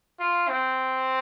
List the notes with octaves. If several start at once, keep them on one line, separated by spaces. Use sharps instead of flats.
F4
C4